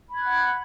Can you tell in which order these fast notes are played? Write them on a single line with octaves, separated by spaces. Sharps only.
B5 G#6 F#6 F#5